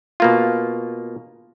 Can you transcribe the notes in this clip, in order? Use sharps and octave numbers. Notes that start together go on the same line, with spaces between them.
B2 A#3 F4